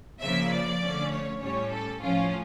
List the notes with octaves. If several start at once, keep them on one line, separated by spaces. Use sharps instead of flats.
C#3 F3 A#3 E5
D5
D3 F3 A3 C#4
C#5
A2 G3 C#4 C#5
A4
A2 F3 C#4 F4